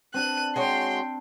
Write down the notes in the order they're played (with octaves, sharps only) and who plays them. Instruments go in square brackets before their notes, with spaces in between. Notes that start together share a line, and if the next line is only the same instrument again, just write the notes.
[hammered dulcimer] C4 D4 G4 [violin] F#6 D#7
[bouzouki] G#3 F#4 C#5 [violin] G5 C6